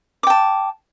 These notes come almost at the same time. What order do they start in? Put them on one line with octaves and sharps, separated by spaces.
D6 G5 A5